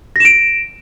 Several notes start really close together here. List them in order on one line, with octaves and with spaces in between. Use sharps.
A#6 E7 D7